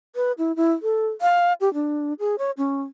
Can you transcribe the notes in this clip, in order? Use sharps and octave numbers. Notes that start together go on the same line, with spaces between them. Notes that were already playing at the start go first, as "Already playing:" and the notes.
B4
E4
E4
A4
F5
G4
D4
G#4
C#5
C#4